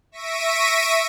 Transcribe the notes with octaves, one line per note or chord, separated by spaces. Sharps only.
E5 C#6 A#6 B6 D7 D#7